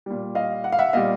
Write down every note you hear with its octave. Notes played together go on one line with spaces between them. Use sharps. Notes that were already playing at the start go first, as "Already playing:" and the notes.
A#2 G3
D#5 F5
F#5
F5
E5 F#5
A#2 G3 D#5 F5